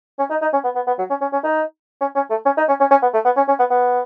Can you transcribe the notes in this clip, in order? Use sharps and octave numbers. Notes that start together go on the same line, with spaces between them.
C#4
D#4
D#4
C#4
B3
B3
B3
F#3
C#4
C#4
C#4
D#4
C#4
C#4
A3
C#4
D#4
C#4
C#4
C#4
B3
A3
B3
C#4
C#4
B3
B3